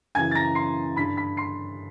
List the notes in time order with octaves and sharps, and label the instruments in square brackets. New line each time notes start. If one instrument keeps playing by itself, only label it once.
[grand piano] F#2 C#3 E3 G#5 G#6
A6
A#5 A#6
C6 C7
G2 D3 B5 B6
B5 B6
C6 C7